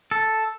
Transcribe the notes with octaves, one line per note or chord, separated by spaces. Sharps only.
A4